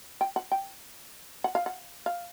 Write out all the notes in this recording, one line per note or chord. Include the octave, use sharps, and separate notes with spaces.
G5
F#5
G5
F#5
F5
F#5
F5